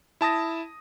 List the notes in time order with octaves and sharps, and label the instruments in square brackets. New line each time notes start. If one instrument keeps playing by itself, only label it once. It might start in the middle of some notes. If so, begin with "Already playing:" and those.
[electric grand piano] E4 A5 D#6 A#6